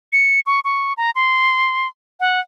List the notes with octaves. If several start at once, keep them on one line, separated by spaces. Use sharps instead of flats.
C#7
C#6
C#6
A#5
C6
F#5